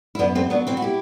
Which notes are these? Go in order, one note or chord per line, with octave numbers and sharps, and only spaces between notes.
E4
F#2 B3 D4
A3 C4
F#3 B3 D4
C4 E4
F#4
E4 G4